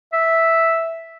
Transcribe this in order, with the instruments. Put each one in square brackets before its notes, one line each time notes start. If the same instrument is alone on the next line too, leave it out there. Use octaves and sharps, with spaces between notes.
[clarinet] E5